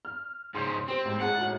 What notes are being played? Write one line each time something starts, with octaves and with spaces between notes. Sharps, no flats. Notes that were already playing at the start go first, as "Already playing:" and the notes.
F6
G#2 C#3 C6 G6
C4 G4 C5
A1 G#2
A2 G#4 F#5 A5
A2 F#4